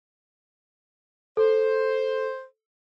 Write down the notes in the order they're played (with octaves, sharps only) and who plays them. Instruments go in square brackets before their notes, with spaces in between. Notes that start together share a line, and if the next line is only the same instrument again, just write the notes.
[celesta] A4 [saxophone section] C5